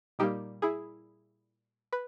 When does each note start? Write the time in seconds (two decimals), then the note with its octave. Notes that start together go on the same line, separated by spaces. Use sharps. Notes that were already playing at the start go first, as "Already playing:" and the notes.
0.19 A#2 G3 A#3 D#4 G4
0.62 E4 G#4
1.93 B4